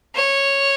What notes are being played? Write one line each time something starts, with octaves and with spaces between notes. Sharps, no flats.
C#5